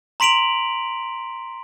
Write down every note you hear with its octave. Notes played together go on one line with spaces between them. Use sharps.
A#5 C6 B6 D7 F7 F#7